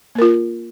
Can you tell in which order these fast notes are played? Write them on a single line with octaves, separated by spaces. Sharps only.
A#3 A#4 F4